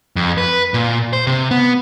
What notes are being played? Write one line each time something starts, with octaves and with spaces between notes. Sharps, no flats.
F2
B4
A#2
C5
C3
B3